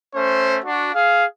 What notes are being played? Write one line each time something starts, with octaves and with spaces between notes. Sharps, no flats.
A3 C#4 C5
D4 F#4
G#4 F5